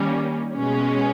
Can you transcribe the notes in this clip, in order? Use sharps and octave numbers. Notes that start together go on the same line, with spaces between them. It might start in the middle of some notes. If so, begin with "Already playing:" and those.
Already playing: D#3 G3 A#3 C#4
B2 G#3 C#4